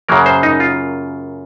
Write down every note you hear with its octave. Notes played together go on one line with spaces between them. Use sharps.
F#2 C#3 F#3 A#3 A#4
C5
D#4
F4